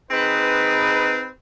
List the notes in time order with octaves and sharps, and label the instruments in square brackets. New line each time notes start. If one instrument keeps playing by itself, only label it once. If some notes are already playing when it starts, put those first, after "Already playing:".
[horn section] C4 D#4 G#4 B4